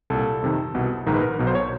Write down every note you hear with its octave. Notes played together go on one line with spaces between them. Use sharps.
C2 A#2 A4
F2 C3 D#3
C2 B2
A#1 G#2 D#3 A#4
B4
A#4
B1 B2
C5
C#5